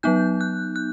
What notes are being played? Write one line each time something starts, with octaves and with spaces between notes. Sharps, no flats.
F#3 B3 D#4 G6
F#6
F#6